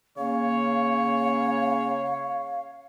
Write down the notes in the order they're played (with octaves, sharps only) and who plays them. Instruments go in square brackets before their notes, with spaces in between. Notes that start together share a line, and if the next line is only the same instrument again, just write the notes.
[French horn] C#3 [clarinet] A#3 [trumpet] C#5 [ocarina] F5